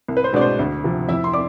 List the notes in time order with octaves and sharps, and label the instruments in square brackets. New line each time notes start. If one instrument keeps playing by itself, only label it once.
[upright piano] C2
B4
C5
B2 G#3 B3 D4 D5
C5
D2
C3 F3
F2 E4 E5
C6
D5 D6